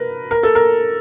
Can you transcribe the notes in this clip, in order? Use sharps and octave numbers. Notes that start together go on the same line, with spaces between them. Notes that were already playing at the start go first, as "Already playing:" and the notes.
Already playing: A#4 B4
A#4
A4
A#4